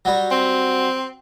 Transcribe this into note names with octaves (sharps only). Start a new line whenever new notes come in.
F#3 G3
C4